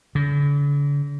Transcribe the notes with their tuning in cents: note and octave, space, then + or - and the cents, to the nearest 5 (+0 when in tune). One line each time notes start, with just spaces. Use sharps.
D3 -45